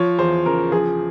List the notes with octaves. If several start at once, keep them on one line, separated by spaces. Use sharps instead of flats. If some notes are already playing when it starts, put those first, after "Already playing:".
Already playing: F3 C#5
E2 C5
C#3 A#4
F3 G#4